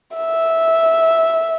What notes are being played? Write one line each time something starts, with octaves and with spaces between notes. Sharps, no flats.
E5